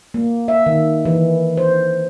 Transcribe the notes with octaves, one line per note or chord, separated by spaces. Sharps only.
A#3
E5
D#3
E3
C5